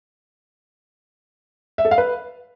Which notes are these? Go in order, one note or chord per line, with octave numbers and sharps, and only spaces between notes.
E5
A4
F5
B4